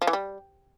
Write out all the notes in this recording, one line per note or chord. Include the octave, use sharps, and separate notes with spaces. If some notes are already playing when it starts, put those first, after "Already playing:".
F3
E3
G3